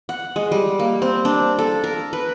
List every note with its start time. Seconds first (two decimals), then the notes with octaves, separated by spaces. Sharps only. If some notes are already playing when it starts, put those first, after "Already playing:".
0.09 F#5
0.36 G#3
0.52 G3
0.79 A#3
1.02 C4
1.25 D4
1.59 A4
1.84 A#4
2.13 B4